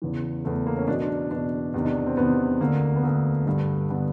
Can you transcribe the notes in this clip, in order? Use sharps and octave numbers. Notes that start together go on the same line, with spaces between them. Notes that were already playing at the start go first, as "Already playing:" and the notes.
E2 C#3 E3
E2 C#3 E3 A3
A#3
C#4
E2 B2 D4
D4
E2 B2 D4
E2 C3 D#3
D4
C4
E2 C3 D#3 B3
D2 D3 A#3
B3
D2 D3 A#3
G2 D3
D3 B3